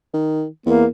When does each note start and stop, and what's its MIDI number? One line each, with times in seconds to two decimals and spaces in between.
0.14 0.46 51
0.66 0.86 40
0.66 0.86 58